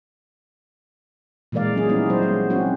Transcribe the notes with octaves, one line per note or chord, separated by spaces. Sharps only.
A#2 E3 G#3 A#4 D5 F5
F#3 C#4 G#4
G3 B3 D#4 E4
F#3 C5
F#3 G#3 B3
C4 C#4 F#4